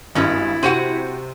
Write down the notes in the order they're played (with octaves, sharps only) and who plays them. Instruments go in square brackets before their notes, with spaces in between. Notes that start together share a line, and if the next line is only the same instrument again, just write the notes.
[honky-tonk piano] G#1 G2 [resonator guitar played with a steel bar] G#3 C#4 [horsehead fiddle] E4
[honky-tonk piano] C3 C5 D#7 [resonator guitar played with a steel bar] C4 F#4 F#5